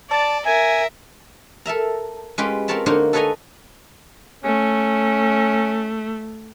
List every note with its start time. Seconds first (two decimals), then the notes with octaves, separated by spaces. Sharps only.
0.11 D5 A5
0.45 A#4 E5 G#5
1.66 A4 A#4 E5 A#5
2.38 G#3 C#4 F4 G4 B4 G5
2.68 C4 F4 A#4 C#5 A5 B5
2.86 D3 A#3 D#4 A#4 C5 C#5
3.13 A4 B4 C#5 D#5 G#5 A#5
4.44 A3 C#4